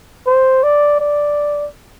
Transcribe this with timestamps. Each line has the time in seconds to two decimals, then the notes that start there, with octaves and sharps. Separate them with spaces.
0.26 C5
0.63 D5
1.00 D5